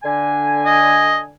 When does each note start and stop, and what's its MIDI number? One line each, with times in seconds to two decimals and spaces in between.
0.03 1.34 50
0.03 1.34 80
0.66 1.18 75